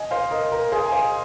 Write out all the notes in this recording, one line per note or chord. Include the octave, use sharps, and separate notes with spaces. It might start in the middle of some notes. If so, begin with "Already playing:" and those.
Already playing: D#5 G#5
C5 F5
A#4 D#5
A#4
G#4 C5
G#5
C5 F5